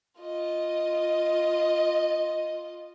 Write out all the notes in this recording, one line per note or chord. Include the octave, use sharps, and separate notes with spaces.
F4 D#5